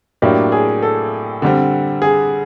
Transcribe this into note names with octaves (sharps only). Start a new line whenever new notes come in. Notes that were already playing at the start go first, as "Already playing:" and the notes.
A2 F#3 A#3 D4 G4
G#4
A4
D3 G3 C4
G#4